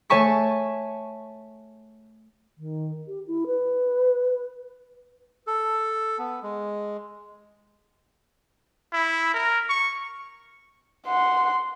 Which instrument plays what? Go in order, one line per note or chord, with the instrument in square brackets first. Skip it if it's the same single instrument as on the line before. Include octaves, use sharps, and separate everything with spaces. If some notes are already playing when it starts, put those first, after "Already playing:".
[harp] A3 C#5 G#5 A5 C#6 B6
[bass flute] D#3
G4
E4
B4
[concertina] A4
B3
G#3
[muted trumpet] E4
A#4
C#6
[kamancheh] F#5 C6